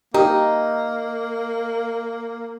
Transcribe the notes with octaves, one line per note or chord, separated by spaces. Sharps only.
A#3 D#4 G4